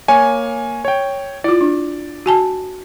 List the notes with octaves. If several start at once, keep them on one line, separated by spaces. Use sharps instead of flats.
A#3 C#5 G#5
C#5 G5
E4 F4 D5
D4
F#4 G#5 A5